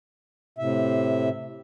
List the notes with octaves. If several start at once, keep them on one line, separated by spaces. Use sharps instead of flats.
A2 C3 E5